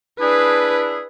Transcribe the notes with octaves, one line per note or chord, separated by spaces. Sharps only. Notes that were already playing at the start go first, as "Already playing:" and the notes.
D4 E4 G#4 B4